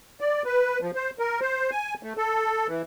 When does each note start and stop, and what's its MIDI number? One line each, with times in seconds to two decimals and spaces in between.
0.21 0.42 74
0.45 0.79 71
0.81 0.91 53
0.95 1.10 72
1.19 1.40 70
1.41 1.70 72
1.71 1.94 80
2.03 2.13 57
2.17 2.67 69
2.68 2.82 52